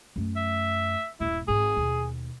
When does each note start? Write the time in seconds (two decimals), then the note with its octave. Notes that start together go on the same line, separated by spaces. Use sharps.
0.16 F#2 A3
0.36 E5
1.20 D#1 G2 E4
1.48 G#1 G#2 G#4
1.77 D#2 B2